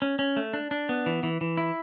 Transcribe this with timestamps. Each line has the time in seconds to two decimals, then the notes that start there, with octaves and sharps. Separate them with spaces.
0.02 C#4
0.19 C#4
0.37 A3
0.53 D4
0.71 D4
0.89 B3
1.06 E3
1.23 E3
1.41 E3
1.57 E4